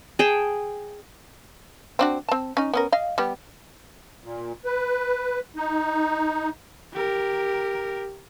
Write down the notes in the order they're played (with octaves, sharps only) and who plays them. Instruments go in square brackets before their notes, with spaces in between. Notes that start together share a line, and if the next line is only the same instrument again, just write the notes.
[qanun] G#4 G5 A5
[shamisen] C4 D4 F#4
C4 A5
C#4 D#4
B3 C#4 A#4
D#5 F5
G3 B3 G4
[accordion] A#2
B4
D#4
[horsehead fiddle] G4 A#4